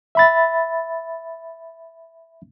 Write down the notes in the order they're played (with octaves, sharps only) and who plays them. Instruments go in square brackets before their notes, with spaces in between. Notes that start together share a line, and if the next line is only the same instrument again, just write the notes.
[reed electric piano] E5 B5 A6